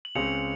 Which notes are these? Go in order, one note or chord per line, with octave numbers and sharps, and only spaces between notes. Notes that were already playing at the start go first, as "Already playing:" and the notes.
F#7
C#2 C#3 G#3 C4 C#7 F7